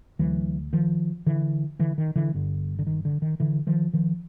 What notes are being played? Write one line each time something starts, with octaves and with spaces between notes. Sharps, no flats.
D2 D3 E3 F#3
D#3 F3
D3 E3
D3 E3
D#3
D3 E3
G1 G2 D3
D3
D#3
D3
D#3
D3 E3
D#3 F3
D#3 F3